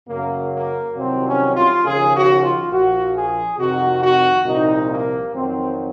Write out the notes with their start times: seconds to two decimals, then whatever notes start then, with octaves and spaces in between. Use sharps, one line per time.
0.08 F#2 C#3 F#3 A#3
0.52 A#3
0.95 C2 C3 D#3 F#3 C4
1.25 C#4
1.54 F4
1.83 D#2 C#3 F3 G#4
2.12 F#4
2.41 F4
2.70 A#1 A#2 F3 F#4
3.14 G#4
3.58 F2 C3 D#3 F#4
4.01 F#4
4.45 C2 A#2 F3 D#4
4.89 A#3
5.32 F2 D#3 F#3 C4